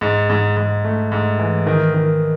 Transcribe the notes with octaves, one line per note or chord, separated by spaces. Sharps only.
G#2
G#2
G#2
A3
G#2
E3
D#3
D#3